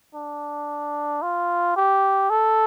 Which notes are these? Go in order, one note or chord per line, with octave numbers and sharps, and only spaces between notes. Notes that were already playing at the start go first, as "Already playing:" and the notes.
D4
F4
G4
A4